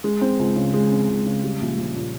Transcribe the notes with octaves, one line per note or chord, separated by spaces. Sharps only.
G#3
C4
C#2
C#3
G#3
C4
C#2
C#3
G3
A#1
A#1
A#2